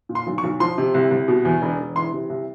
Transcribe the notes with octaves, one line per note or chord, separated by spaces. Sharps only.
A#2
C6
B1
C#6
B1
F3 C6
C3
C2
C2
B2
E2
E1
E1
E3 C6
C3
C2